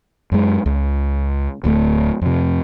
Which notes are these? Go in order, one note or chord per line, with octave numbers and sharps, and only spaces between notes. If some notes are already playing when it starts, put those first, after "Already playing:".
F#2 G#3
C#2
D1 D2 G#3 A3
F2 C3